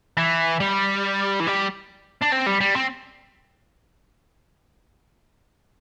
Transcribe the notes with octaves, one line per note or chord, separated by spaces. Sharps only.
E3
G3
E3
G3
D4
C4
G3
G3
C4